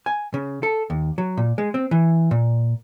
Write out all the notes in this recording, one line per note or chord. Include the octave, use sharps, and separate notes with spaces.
G#5
C#3
A4
D#2
F#3
A#2
G#3
C4
E3
A#2